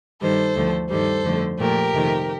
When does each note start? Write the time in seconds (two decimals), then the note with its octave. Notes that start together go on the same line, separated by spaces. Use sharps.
0.21 G2 D#3 G3 A4 C5
0.56 D2 D3 F3 A3
0.90 G2 D#3 G3 A4 C5
1.25 F2 D3 A3
1.59 A#2 F3 A3 G4 A#4
1.94 F2 C3 D#3 A3